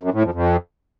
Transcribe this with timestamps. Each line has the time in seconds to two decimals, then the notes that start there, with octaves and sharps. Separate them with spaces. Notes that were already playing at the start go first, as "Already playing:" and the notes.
0.03 F#2
0.13 A2
0.24 F2
0.34 F2